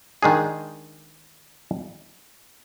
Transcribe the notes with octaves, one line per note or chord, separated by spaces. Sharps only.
D#3 G#3 D4 G#4